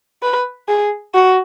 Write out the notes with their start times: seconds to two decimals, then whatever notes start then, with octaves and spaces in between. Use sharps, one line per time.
0.22 B4
0.68 G#4
1.14 F#4